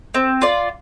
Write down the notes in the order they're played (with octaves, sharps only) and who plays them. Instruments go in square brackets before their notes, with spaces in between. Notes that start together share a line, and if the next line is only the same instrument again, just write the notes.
[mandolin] C4
F4 D5